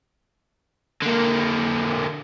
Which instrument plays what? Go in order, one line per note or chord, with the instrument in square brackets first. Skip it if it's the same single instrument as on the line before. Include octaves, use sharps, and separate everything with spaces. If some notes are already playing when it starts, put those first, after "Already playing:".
[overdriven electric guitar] D3 A#3